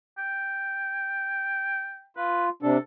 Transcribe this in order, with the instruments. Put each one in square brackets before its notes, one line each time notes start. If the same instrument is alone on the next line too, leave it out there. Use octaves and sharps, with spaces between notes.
[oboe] G5
[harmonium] F4 [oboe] B4
[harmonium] C3 D4 [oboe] A4